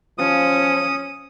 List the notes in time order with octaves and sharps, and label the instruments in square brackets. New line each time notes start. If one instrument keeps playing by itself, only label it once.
[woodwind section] F3 [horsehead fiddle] C#4 [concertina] D#6